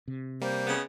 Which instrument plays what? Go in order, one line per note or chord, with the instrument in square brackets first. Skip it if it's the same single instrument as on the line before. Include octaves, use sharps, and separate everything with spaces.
[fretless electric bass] C3
[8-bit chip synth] G3 A#3 [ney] C5
[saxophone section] C#3 G#3 B3